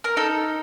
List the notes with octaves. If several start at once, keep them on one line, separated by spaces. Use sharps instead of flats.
A#4
D#4 A4